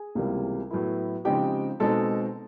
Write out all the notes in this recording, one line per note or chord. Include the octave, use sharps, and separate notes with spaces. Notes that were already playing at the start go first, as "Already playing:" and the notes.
Already playing: G#4 G#5
C#2 C3 E3 G3 A#3
A2 F#3 B3 E4
C#3 F3 G#3 C4 D#4 G4 G5
B2 G#3 C4 D#4 A4 A5